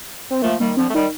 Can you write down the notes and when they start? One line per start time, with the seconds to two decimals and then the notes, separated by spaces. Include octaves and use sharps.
0.30 C4
0.42 F3 A3 A#3
0.60 D#3 G3 A#3
0.77 D3 F3 C4
0.89 A3
0.94 D#3 G3 D#4